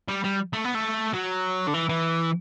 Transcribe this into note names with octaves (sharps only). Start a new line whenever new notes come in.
G3
G3
A3
B3
A3
F#3
D3
E3
E3